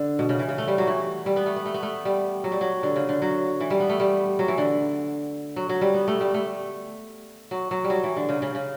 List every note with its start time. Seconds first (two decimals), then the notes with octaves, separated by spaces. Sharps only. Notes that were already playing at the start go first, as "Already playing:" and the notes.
Already playing: D3
0.19 B2
0.29 C#3
0.39 E3
0.49 C#3
0.58 A3
0.68 G3
0.78 F#3
0.87 E3
1.26 G3
1.36 B3
1.46 A3
1.56 B3
1.66 A3
1.74 B3
1.83 A3
2.05 G3
2.44 F#3
2.52 G3
2.61 F#3
2.83 D3
2.96 C#3
3.09 D3
3.22 F#3
3.60 E3
3.70 G3
3.80 B3
3.89 A3
4.00 G3
4.39 F#3
4.48 E3
4.58 D3
5.56 F#3
5.69 F#3
5.81 G3
5.94 B3
6.08 A3
6.21 G3
6.34 A3
7.51 F#3
7.71 F#3
7.84 G3
7.90 F#3
8.04 E3
8.17 D3
8.29 C#3
8.42 C#3
8.55 C#3